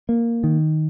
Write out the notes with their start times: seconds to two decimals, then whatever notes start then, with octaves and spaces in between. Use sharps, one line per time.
0.09 A#3
0.44 D#3